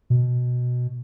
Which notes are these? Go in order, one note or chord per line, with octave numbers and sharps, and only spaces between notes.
B2